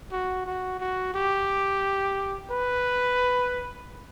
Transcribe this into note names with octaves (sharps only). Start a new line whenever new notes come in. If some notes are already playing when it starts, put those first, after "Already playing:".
F#4
F#4
F#4
G4
B4